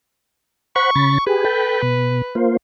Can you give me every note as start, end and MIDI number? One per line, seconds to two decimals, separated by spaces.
0.76 0.91 72
0.76 0.91 78
0.76 0.91 83
0.76 1.22 85
0.96 1.18 49
0.96 1.18 83
0.96 1.18 93
1.27 1.44 67
1.27 1.44 68
1.27 2.38 71
1.45 1.82 69
1.45 1.82 79
1.45 1.82 83
1.83 2.22 47
2.35 2.57 58
2.35 2.57 65
2.35 2.57 72